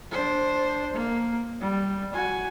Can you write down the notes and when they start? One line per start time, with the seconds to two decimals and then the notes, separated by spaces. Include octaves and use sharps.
0.12 D4 C5
0.93 A#3
1.61 G3
2.13 F#4 G#5